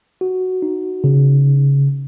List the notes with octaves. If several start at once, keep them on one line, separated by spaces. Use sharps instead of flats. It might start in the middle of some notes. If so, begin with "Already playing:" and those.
F#4
D#4
C#3